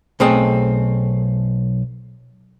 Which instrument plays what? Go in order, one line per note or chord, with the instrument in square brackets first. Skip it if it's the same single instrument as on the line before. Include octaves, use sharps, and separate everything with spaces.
[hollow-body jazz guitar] B1 A3 C4 G#4 D#5 A5